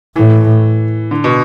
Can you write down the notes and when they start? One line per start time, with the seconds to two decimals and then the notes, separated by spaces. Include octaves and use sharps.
0.16 A2 E3
1.11 D3
1.24 B2